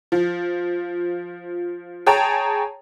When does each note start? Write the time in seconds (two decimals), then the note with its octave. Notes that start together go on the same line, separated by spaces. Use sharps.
0.12 F3
2.06 G#4 C#5 G5 A5 A#5